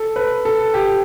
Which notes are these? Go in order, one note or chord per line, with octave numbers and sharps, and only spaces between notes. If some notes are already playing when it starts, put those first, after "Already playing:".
Already playing: A4
B4
A4
G4